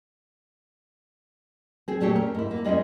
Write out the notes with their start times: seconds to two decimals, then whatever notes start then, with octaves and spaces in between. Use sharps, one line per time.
1.88 C4 G#4
2.01 A#2 A3 C4 C#4 G4 C#5
2.16 A#4
2.35 G#2 E4
2.51 A#3
2.64 G3 G#3 C#4 D#4 E4